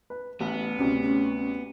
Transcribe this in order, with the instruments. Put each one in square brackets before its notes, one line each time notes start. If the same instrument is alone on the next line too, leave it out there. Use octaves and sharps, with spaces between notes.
[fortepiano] B4
[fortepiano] A1 [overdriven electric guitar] B3
[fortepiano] D2 C3 [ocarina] C#4
[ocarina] C#4